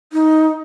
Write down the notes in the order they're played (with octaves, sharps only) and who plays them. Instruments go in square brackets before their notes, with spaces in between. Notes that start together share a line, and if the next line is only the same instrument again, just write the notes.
[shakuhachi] D#4